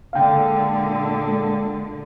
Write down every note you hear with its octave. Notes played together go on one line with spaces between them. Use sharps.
A#2 D3 G#3 F5 G5